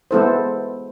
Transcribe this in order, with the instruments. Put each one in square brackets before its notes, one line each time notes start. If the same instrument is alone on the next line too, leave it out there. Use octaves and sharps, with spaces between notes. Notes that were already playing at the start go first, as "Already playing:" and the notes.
[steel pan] G#3 B3 E4 A4 C5